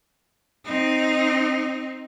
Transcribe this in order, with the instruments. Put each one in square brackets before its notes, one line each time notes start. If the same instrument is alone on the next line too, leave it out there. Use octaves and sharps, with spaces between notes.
[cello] C4 D#4